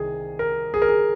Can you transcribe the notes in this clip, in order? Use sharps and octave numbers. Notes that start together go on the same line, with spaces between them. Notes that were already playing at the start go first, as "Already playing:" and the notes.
Already playing: C2 D#3 G#4
A#4
G#4
A#4
G#4